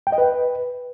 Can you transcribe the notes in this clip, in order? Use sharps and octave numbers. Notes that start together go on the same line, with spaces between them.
G5
D#5
B4